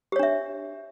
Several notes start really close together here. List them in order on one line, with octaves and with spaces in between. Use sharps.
G4 C#5 D4 E5